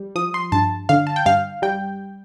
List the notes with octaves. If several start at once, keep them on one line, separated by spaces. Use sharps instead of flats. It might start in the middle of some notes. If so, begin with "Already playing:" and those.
Already playing: G3
F3 D#6
C6
G2 A5
D3 F5
A5
G5
G2 F5
G3 G5